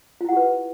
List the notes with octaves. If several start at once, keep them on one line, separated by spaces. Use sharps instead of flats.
E4 F4 G4 B4 F#5